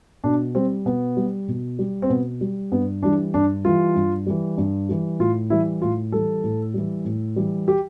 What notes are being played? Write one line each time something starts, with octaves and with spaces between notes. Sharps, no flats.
B2 D4
G3 C4
B2 B3
G3
B2
G3
C4
B2 B3
G3
G2 B3
E3 G3 D4
G2 D4
E3 G3 F4
G2
E3 G3
G2
E3 G3
A2 F4
E3 G3 E4
A2 F4
E3 G3 A4
A2
E3 G3
A2
E3 G3
G4